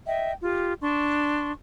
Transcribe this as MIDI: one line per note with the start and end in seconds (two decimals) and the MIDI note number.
0.06 0.32 75
0.06 0.32 76
0.06 0.32 79
0.41 0.74 65
0.41 0.74 67
0.81 1.52 62
0.81 1.52 84
0.81 1.52 85